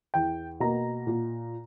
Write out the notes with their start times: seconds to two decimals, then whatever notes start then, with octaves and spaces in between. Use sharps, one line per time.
0.14 E2 G5
0.60 B2 A#3 A#5
1.07 A#2